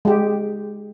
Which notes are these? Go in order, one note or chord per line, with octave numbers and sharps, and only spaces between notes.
G#3 G4